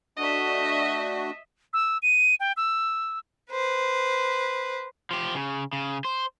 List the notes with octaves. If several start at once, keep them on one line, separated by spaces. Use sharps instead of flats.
A3 D4 F#4 D#5 E5
E6
D#7
G5
E6
B4 C5
F3 G4
C#3
C#3
C5